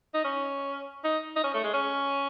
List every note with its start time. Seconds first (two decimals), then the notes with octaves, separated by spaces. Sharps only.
0.14 D#4
0.25 C#4
1.04 D#4
1.37 D#4
1.44 C#4
1.54 A3
1.64 G#3
1.74 C#4